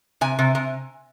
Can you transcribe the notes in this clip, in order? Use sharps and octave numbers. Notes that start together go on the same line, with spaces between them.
C3 G#5
C3
C3